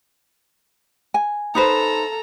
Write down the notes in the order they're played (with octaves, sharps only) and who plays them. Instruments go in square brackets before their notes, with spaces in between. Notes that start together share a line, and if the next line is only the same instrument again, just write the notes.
[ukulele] G#5
[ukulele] D#4 B4 C5 [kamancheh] A4 A#5